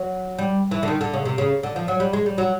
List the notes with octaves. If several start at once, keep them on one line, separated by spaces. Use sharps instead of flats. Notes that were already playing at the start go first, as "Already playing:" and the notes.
Already playing: F#3
G3
E3
D3
D#3
D3
C#3
C3
C#3
D3
F3
F#3
G3
G#3
G3
F#3